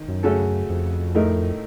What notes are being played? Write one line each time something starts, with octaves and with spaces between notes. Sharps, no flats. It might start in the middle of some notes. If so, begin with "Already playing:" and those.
Already playing: D#3
F#2
C#3 A3 C#4 F#4 A4
F2
A2 A3 D#4 A#4